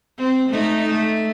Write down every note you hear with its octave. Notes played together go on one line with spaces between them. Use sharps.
C4
A3 D#4
A3